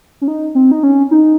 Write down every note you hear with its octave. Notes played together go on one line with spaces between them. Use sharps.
C#4
D#4
C4
D#4
C#4
D#4